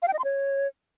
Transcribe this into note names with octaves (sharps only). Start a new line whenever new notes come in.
F5
G5
D#5
C6
C#5